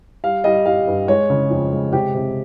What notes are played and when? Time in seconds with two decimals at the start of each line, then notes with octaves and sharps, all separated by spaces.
0.24 G3 F5
0.44 G3 D#5
0.66 G3 F5
0.87 G2
1.08 G#3 C#5
1.30 C#3
1.50 F2
1.73 G#3
1.93 C3 G4
2.14 C3